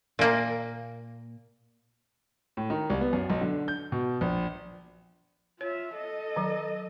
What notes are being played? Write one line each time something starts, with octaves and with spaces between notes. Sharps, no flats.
A#2 A#3
A2
D#3
C2
B3
F#2
B1
D3
G6
B2
A#1
F4 C#5 E5
A4 D#5
D#3 F#3